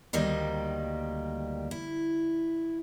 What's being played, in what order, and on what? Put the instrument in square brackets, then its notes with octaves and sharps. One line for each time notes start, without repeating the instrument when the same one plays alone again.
[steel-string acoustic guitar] D2 D#3 G3 A#3 D#5
E4